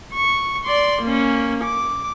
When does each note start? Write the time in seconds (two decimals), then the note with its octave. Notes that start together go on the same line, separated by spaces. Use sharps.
0.13 C#6
0.66 D5 C6
1.02 A#3 C#4
1.64 D6